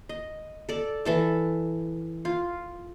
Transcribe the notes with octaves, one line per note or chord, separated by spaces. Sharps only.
D#5
A4 D5
E3 A4 A5
F4